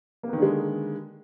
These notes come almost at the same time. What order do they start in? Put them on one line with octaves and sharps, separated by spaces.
A#3 B3 D#3 D3 G#3